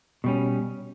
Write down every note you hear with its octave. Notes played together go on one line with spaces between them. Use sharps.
B2 G3 C#4